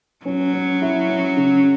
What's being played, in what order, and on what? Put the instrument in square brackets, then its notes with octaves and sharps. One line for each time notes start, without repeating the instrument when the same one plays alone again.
[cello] F#3 [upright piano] C#4
[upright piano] C#4
E4
C#4
C#3